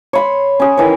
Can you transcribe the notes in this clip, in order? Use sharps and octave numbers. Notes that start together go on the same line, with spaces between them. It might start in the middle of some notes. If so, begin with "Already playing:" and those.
C#5 B5 C6
C#4 G#4
D#3 E3 C#5